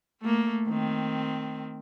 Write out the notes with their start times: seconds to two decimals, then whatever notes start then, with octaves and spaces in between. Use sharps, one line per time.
0.22 A3 A#3
0.69 D#3 C4